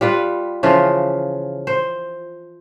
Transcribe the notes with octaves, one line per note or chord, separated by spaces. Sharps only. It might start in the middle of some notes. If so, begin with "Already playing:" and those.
G3 F4 B4
C#3 E3 F3 F4
C5